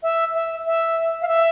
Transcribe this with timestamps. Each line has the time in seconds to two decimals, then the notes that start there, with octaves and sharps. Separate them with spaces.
0.03 E5
0.34 E5
0.66 E5
1.22 F5
1.28 E5